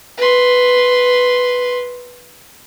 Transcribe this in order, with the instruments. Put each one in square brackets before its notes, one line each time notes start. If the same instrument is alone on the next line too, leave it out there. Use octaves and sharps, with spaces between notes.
[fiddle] B4 C6